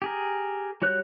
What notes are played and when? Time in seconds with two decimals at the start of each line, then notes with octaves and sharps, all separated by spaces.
0.02 G4 G#4 A#4
0.82 G3 F#4 C#5 F#6 G6